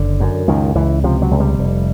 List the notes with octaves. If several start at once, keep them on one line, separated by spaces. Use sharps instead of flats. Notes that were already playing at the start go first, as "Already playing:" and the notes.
Already playing: F#1 D3
F#2
C#2 D#3
C#2 E3
C3 F3
F#3
C#2
G3
F1